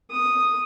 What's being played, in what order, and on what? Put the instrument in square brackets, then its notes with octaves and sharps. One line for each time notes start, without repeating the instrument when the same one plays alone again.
[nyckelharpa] D#6